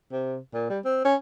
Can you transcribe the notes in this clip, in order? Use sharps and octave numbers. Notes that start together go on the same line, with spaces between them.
C3
A#2
G3
C4
C#4